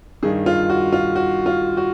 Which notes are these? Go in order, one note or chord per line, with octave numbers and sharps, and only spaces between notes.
G2 D#3 G#4
F4
F#4
F4
F#4
F4
F#4